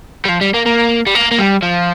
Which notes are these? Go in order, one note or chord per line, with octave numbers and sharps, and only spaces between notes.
G3
F3
G3
A#3
A#3
G3
A#3
A#3
G3
F3